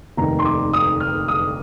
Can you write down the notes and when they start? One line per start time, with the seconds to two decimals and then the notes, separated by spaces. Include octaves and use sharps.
0.17 F1 D#2 D#3 A#5
0.39 C6
0.45 D6
0.73 D#6
1.00 F6
1.28 D#6